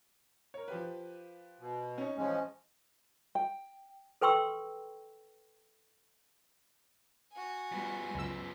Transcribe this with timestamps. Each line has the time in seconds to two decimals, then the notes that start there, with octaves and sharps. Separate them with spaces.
0.54 A#4 C#5
0.68 F3 G4 B4
1.60 B2
1.98 C#4 D#4 C#5
2.17 A1 F3 G#3 C#4
3.35 G5
4.21 A4 B4 G5 C6 C#6 E6
7.32 F#4 G#5
7.72 F3 G3 B3
8.14 C#2 F#2 E6